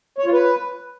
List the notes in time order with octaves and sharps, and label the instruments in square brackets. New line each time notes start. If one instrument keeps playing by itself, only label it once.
[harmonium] C#5
F4
B4